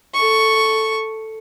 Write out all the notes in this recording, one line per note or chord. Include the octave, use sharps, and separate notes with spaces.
A4 C#6